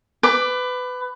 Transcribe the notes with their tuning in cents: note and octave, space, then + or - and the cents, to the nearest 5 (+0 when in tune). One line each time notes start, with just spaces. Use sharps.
B4 +20 D6 +15